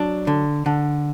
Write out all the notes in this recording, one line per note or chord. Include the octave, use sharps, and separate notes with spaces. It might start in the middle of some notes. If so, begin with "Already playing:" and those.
Already playing: F#3 D4
D3
D3